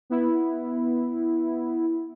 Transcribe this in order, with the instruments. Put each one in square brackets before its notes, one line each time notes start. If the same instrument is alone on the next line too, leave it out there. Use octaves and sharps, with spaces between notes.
[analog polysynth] B3 E4